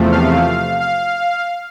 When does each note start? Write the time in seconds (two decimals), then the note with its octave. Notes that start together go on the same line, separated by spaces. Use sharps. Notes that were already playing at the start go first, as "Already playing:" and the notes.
Already playing: E2 C3 F3 A3
0.12 F5
0.80 F5